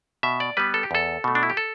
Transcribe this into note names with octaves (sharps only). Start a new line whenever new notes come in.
B2 E5
D5
G3 B3 B4
A4
G4
E2 A4
B2 A3
D4
E4
G4
A4